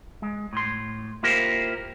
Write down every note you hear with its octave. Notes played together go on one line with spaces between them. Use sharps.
G#3
A2 C6
A#3 E4 F4 G4 A#4 C5